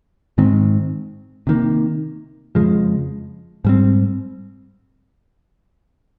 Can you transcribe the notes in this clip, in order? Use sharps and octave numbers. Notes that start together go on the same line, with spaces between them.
G#2 D#3 G#3 C4
C3 D#3 A#3
F2 C#3 F3 G#3
G#2 G3 C4